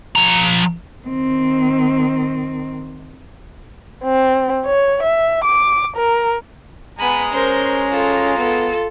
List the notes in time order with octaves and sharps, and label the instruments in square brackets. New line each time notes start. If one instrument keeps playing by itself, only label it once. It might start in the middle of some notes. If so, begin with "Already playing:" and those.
[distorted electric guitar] F3 A#5
[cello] D#3 C4
[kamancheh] C4
C#5
E5
D6
A#4
[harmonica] G#3 A#5 [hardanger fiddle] B3 G#5 [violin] B5
[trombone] C#4 [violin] A#4 C6 [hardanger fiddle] C5
[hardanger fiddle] F4 [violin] A4
[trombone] B3 [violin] A4